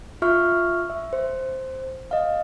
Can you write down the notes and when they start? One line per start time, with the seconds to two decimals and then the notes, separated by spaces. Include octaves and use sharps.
0.22 F4 E5 C#6 F6
0.90 E5
1.13 C5
2.11 D#5 F5